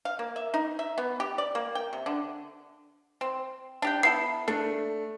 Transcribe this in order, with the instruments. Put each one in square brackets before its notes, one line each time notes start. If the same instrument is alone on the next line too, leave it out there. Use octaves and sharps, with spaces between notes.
[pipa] F5
A#3
E5
D#4
E5
B3
G4
D5
A#3
G5
C3
D3
C4
D4 G4 G5
[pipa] B3 E4 A4 [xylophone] C7
[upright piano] A3 [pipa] D4